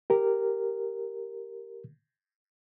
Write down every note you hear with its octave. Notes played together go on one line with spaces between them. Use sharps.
G4 A#4